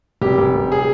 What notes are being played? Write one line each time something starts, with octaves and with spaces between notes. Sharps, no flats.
F1 G4
F1
F1
G#4